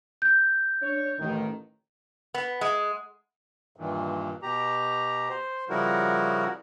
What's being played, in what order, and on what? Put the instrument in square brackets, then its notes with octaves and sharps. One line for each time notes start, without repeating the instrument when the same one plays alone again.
[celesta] G6
[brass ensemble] D4 C#5
A1 D#3
[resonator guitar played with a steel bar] B3
G#3
[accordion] G2 A#2 D#3 E3
B2 G4 A#5
C5
C#3 F3 G3 E4 F#4 A#4